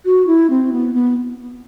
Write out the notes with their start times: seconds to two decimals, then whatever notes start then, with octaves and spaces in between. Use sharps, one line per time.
0.05 F#4
0.27 E4
0.50 C4
0.72 B3
0.94 B3